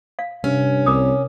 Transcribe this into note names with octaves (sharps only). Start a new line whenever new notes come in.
F5
G2 C3 C#4
C2 A#4 C#5 D6 D#6